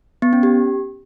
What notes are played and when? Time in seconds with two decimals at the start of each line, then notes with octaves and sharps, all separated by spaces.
0.22 B3
0.33 C#4
0.43 G4